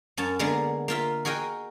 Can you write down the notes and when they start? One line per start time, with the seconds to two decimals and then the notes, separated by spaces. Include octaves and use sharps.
0.17 F#2 C#4 A5
0.39 D3 G#3 A#3 B3
0.88 A#3 F4 E5
1.25 F#4 G#4 A#4 D#5 G5